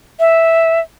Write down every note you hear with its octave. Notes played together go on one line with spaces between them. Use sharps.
E5